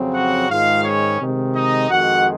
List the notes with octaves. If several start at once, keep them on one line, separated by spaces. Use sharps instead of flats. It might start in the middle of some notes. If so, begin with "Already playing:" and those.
Already playing: F2 C#3 F#3 C4
F#4 F#5
G#2 D#3 G#3 F4 F5
C#4 C#5
C3 D#3 G#3
D#4 D#5
F2 D#3 G#3 F#4 F#5